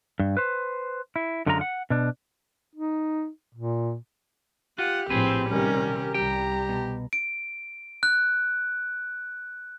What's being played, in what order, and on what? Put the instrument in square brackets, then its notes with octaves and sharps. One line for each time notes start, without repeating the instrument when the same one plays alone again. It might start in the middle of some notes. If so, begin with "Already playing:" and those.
[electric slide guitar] G2
B4 C5
E4
F#2 D3 G#3 F4 G4 A#5
F#5
B2 D4
[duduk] D#4
A#2
[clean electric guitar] F4 [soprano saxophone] G4 [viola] F#5
[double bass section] A#1 A2 F3 [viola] C4 [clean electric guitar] G#4 B4
[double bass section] C3 D#3 G3 [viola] C#4 A#4
[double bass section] C2 G3 [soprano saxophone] G4 [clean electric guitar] G5 [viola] A#5
[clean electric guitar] B2
[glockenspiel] D7
F#6